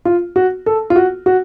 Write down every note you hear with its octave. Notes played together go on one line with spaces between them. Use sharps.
F4
F#4
A4
F4
F#4
F#4